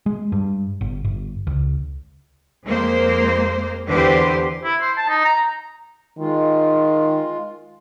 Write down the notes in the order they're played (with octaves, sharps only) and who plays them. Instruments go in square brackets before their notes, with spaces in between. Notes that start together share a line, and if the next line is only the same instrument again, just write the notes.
[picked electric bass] G#3
G2
G1
G1
C#2
[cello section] F2 G#3 A#3 C5
E2 D3 G4 B4 C5
[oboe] E4
C5
A5
D#4
A#5
[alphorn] D#3 [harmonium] G#3 F4